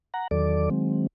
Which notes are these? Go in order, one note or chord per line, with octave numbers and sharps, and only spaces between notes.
F#5 A#5
E2 D#3 F#3 A4 D5 D6
D#3 F#3 G#3 C4